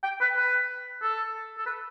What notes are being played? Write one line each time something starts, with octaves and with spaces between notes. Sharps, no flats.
G5
B4
B4
A4
A4
B4